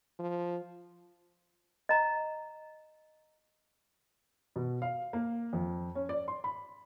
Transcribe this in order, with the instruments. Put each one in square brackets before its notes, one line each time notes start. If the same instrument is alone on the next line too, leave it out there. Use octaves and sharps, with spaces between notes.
[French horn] F3
[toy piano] D#5 A#5
[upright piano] B2
F5
A#3
F2
C#4
D5
C6
B5